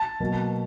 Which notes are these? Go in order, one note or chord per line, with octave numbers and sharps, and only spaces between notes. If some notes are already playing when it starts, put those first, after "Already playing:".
Already playing: A5
B2 F#3 A#3